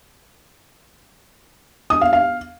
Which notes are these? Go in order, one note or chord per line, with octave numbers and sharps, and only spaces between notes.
D#6
F5
F5